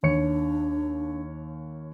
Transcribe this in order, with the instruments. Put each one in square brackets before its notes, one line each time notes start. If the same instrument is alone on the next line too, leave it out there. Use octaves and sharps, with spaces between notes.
[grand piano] D#2 C#5 C#7 [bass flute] D4